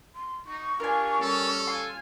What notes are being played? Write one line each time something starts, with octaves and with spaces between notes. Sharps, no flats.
C6
D#4 C#6
D4 F4 G4 A#4 G#5
G3 C#4 A4
F4 G#5 C6